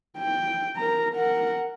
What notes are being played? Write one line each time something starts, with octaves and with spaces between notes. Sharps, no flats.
G5
A#4 A#5
A#4 F#5